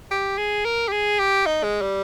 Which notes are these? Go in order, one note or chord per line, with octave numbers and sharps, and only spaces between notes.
G4
G#4
A#4
G4
G#4
G4
D#4
G#3
G3